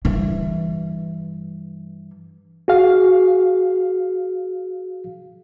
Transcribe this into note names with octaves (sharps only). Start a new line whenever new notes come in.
G2 E3
F#4 G#4 F5